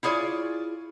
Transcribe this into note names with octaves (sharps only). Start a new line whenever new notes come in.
E4 F4 G#4 C#5 D5